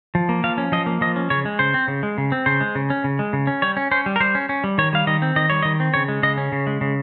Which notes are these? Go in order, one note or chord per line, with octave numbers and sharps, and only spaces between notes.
F3
A#3
F3 F5
C#4
F3 D#5
A#3
F3 D#5
C#4
C#3 C#5
G#3
C#3 C5
C4
C#3
G#3
C#3
C4
C#3 C5
G#3
C#3
C#4
C#3
G#3
C#3
C#4
G3 C#5
C#4
C#4 C5
G3
A#4
G3 C5
C#4
C#4
G3
D#3 C#5
G3 F5
D#3 D#5
C4
D#3 D#5
G3 C#5
D#3 D#5
C4
C#3 C#5
G#3
C#3 D#5
C#4
C#3
G#3
C#3